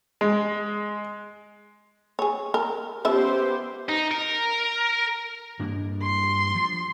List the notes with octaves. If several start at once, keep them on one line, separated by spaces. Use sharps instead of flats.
G#3
G#4 C#5
A#4
F3 B3 C#4 G4 C5 E5
D#4
A#4
G2 A#3 D4
C6
F3